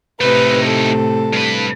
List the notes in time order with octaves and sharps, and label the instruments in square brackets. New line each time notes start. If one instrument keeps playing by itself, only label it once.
[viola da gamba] A2 C3 [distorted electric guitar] A3 D#4 [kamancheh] B4
[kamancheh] A4
[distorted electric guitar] G2 B4